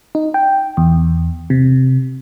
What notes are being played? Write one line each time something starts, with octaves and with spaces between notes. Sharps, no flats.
D#4
G5
E2
C3